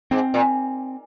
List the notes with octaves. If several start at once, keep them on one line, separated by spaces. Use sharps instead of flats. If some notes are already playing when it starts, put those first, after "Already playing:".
G#2 C4
A#2